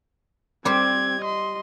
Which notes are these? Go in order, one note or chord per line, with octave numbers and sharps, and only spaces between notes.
G3 C4 G4 C5 G#6
D#5 C6